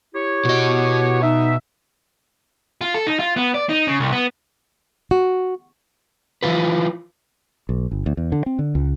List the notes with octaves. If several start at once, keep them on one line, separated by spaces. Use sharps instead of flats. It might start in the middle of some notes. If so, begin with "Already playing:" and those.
E4 G4 C#5
B2 F#4 D#5
D#4 E5
F4
A4
D#4
F4
B3
D5
D#4
C#3
C2
B3
F#4
E3 F3 F4 B4
B1
G1
D2
E2
D3
C4
D3
C#2